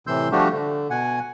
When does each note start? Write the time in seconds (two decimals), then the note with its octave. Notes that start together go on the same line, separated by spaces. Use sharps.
0.07 A2 C3 E3 C6 E6 G6
0.32 F3 G3 A3 D4 F#4 G4
0.52 D3
0.90 B2 F#5 G#5